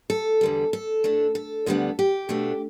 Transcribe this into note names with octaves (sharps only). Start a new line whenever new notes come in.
A4
E2 D3 G3
A4
A2 A3 D4
A4
D2 D3 G3 B3 D4
G4
B2 A3 D4